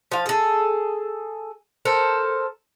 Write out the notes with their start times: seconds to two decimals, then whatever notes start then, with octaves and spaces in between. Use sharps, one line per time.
0.12 F3 F5
0.26 G#4 A4
1.85 A4 A#4 C5